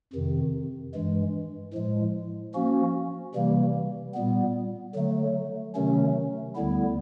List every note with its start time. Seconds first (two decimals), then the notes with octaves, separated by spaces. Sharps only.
0.13 F2 C3 D#3
0.94 G2 E3 G#3
1.73 A2 F3 G#3
2.54 F3 A#3 C#4 F#4
3.34 C3 E3 G3 A#3
4.14 A#2 G3 B3
4.95 D3 F#3 A3
5.75 C3 D#3 F#3 A3 C#4
6.55 D2 D3 G3 B3 E4